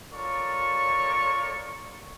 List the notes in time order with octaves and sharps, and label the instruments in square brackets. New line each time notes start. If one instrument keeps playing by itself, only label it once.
[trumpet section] F4 A4 A#4 C#5 D5 C#6